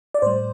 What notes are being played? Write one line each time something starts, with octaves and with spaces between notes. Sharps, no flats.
D5
A2 G3 C5